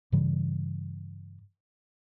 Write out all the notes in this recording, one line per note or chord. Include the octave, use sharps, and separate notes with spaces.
G2 C#3 E3 G3